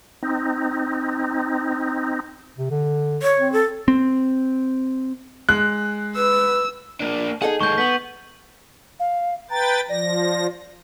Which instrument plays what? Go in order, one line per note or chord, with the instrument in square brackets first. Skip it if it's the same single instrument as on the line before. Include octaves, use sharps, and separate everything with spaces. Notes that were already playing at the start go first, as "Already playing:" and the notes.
[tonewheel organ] C4 D#4
[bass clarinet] C3
D3
[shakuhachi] C#5
[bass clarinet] C4
[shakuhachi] A4
[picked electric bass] C4
[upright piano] G#3 [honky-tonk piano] F#6
[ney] B4 [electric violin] E6
[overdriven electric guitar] A#3 D4
[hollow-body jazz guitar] D#4 A4 F#5 [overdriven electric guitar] G#4
[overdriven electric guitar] D#2 G#3 [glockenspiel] C#6 G6
[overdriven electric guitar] B3 [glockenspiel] B6 F#7
[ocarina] F5
[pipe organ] B4 G5 A6 [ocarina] A#5
[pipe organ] F3 A#6 [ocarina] D5